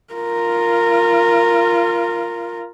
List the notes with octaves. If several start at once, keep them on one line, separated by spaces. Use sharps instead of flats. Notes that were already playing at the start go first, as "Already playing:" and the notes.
F4 A#4